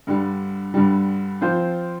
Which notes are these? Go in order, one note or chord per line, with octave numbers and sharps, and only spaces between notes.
G2 D3 G3
G2 D3 G3
F3 C4 F4 C5